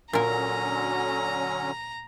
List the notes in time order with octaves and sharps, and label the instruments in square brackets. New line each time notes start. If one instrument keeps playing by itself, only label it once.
[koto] A#2 A#4 [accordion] D3 F#3 C#4 [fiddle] A#5